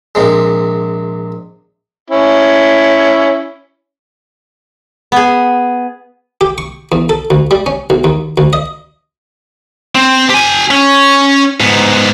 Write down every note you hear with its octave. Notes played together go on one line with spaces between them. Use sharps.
A#1 C3 G#3
C#4 E4
B3 G#4
G4
C#6
E2
A4
D2
G3
C#4
B1
D#2
D2
D#5
C4
G4 G#5
C#4
G#2 B3